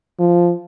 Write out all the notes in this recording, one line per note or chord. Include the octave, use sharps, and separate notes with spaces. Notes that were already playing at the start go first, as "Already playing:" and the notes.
F3